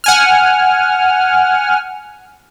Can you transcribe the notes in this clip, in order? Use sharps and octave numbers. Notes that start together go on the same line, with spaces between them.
F#5 G#5 F6